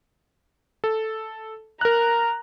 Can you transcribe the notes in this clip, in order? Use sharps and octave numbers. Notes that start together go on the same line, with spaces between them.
A4
A#4 A#5 F#6